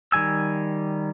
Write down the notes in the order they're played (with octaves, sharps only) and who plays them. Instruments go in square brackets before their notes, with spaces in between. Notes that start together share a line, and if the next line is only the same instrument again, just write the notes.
[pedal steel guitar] D#3 G3 G#5 E6